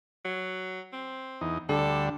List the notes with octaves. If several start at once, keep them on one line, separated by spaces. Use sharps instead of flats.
F#3
C4
E2 D#4
D2 D3 G3 A4